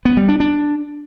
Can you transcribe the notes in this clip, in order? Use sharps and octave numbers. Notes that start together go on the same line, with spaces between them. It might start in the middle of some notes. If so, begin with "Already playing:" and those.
B3
G3
D4
D4